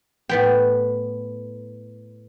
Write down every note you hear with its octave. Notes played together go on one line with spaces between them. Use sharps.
A2 B3 G5